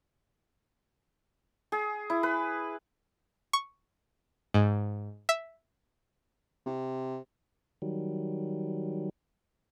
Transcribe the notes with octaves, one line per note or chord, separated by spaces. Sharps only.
G#4
E4
B4
C#6
G#2
E5
C3
D#3 F#3 G3